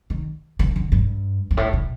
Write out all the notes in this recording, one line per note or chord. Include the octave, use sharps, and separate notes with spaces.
D#3
D3
D3
G2
G2
A2
A#2